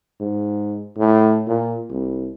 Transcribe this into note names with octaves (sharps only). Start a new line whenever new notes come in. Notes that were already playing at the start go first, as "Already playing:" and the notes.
G#2
A2
A#2
C2